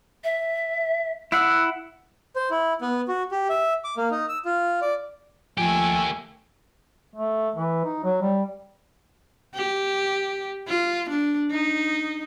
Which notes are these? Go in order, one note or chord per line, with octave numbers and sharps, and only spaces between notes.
E5
E4 F#5 E6
C5
E4
B3
F#4
G4
E5
D6
A#3
D#4
E6
F4
D5
F3 A3 A#3 G4 G#5
A3
E3
D#4
F#3
G3
G4
F4
D4
D#4